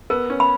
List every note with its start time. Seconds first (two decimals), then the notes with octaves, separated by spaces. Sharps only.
0.10 B3 A#4
0.30 C#4
0.40 B5